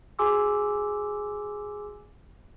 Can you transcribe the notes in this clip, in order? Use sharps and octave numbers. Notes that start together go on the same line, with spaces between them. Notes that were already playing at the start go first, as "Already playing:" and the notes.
F#4 G#4 G#5 C6 D6 E6